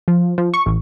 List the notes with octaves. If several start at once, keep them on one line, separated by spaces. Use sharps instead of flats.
F3
F3
C#6
A1